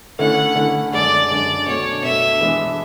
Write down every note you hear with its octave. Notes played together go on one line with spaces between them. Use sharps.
D3 A3 C#4 E4 F#5
D3 A3 C#4 E4
F#2 D3 G#3 D4 D5
F#2 D3 G#3 D4 D5
B2 A3 D4 C#5
B2 A3 D4 E5
E3 G#3 B3 D4